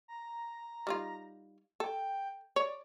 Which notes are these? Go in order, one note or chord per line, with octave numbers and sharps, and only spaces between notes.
A#5
G3 D#4 F4
A4 G5
C#5 D5